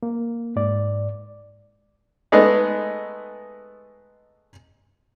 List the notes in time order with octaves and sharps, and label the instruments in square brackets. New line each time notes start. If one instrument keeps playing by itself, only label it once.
[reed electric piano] A#3
G#2 D5
[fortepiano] G#3 A3 B3 D#4